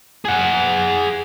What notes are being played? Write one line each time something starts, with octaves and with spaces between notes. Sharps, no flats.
G#4 F#5